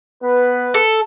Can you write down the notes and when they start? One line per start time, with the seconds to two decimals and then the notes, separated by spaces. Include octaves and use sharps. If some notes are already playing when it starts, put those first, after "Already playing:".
0.23 B3 B4
0.74 A4